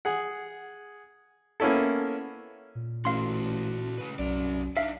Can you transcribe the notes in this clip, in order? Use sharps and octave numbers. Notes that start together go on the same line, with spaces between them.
G#4 F#5
A#3 B3 C#4 E4 A4
A#2
A1 F#4 A4 F5 C6
C#3 B4
B1 F#2 C3 D5
D4 D#4 E5 F5